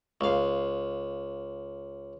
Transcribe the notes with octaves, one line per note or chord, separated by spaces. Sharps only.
C#2 F5